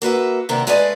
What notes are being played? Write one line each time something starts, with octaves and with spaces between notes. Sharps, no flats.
A#3 F#4 B4 E5
C3 D#3 A#3 B3 D4
G#3 A3 G#4 B4 D5 D#5